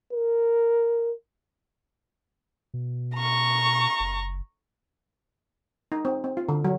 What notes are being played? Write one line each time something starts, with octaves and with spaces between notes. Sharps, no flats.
A#4
B2
A#5 C#6
F#1
D#4
C4
C4
F4
D3
F#3